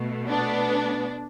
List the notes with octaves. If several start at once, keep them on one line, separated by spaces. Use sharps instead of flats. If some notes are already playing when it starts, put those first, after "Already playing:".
Already playing: B2 A3
B3 D4